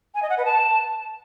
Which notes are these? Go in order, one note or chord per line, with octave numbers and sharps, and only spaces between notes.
G#5
D#5
F#5
B4
A5